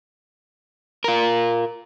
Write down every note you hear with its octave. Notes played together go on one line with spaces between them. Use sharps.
F4 A#4